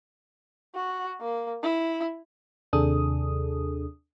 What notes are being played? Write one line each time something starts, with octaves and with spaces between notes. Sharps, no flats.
F#4
A#3
E4
D#2 C3 D4 G#4 A4 D#6